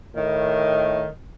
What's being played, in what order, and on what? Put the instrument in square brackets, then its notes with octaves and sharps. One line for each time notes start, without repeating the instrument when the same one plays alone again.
[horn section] A2 D#3